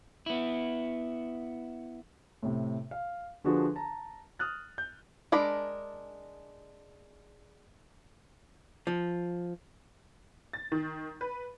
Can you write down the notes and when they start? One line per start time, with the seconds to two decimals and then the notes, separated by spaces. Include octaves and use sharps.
0.26 B3 E4
2.43 A2 C3
2.91 F5
3.44 D3 F3 D4 F#4 G#4 B4
3.76 A5 A#5
4.39 D#6 F6 F#6 A6
4.78 G6
5.32 G#3 D4 A#4 B5
8.87 F3
10.53 A6
10.72 D#3
11.21 B4